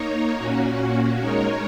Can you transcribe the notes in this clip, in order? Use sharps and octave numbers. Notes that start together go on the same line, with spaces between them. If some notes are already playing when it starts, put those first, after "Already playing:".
Already playing: A#3 D#4 A#4 C#5
A#2 A#3 C#4 F#4
G#3 D#4 A#4 C#5